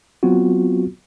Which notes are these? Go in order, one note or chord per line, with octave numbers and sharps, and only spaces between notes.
F#3 B3 C4 F4 F#4